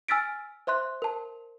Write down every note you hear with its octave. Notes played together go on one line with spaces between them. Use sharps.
G#5 E6 F6 A6 B6 D7
C5 E5 C6 F#6
A#4 A5